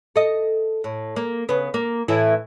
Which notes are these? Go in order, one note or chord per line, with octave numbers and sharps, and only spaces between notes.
A4 D#5
A2
A#3
C#3 B3
A#3
A2 E3 E4